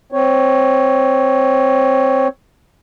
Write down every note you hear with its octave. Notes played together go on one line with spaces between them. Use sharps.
C4 C#5